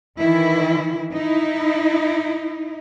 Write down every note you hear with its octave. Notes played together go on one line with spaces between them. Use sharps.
D#3 E3 E4
D#4 E4